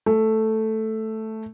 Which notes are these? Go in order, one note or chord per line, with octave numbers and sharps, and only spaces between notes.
A3